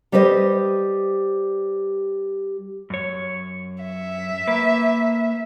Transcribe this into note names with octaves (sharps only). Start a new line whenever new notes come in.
G3 G4 B4 C5 D#5
F#2 C#5
E5
A#3 B4